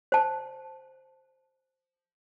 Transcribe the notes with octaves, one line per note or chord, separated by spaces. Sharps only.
C5 A5